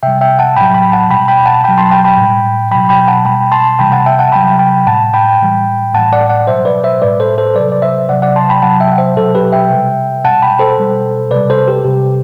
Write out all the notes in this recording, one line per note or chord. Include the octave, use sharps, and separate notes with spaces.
C3 G3 E5 G5
E5 G5
F#5 A5
A2 F#3 G5 B5
G5 B5
F#5 A5
B2 G3 G5 B5
G5 B5
F#5 A5
B2 F#3 G5 B5
A5 C6
G5 B5
G5 B5
A2 G3
B2 F#3 G5 B5
G5 B5
F#5 A5
B2 G3 G5 B5
A5 C6
C3 E3 G3 G5 B5
F#5 A5
E5 G5
F#5 A5
C3 F#3 G5 B5
G5 B5
A2 G3 F#5 A5
G5 B5
A2 E3 G3
A2 E3 G3 F#5 A5
D5 F#5
D5 F#5
B2 F#3 C5 E5
B4 D5
C5 E5
A2 G3 B4 D5
A4 C5
A4 C5
C3 F#3 B4 D5
D5
C5 E5
C3 F#3 D5 F#5
D5 F#5
A5 C6
G5 B5
C3 F#3 F#5 A5
E5 G5
F#5
C5 E5
B2 F#3 A4 C5
G4 B4
E5 G5
C3 G3
B2 G3 F#5 A5
G5 B5
A4 C5
B2 G3
C3 G3 B4 D5
A4 C5
G4 B4
C3 G3 G4